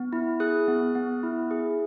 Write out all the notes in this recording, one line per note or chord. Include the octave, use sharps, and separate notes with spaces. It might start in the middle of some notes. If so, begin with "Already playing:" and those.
Already playing: B3
E4
G#4 D#6 F#6
B3
B3
E4
G#4